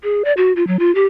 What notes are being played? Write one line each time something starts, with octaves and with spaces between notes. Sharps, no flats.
G#4
D5
F#4
F4
F#3
F4
G4